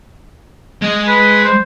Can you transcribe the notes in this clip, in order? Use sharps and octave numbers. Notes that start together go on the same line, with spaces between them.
G#3 D#5
B4
C5